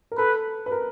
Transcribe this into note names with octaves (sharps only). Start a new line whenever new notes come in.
A#4
A4 B4
B4
A#4